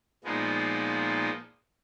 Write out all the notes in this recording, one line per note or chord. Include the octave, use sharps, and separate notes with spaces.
A#2 F3 G#3 B3 D#4